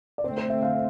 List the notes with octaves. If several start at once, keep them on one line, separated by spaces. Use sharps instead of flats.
D5
D3 A3 C4 C5
C5
E5
F5